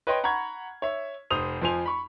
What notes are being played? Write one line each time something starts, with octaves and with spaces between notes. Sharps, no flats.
B4 C#5 D#5 G5 C6
F#5 A#5 B5 C#6 G#6
C#5 E5
F1 C5 D#6 F7
F2 F3 C5 G#5 F7
B5 C#6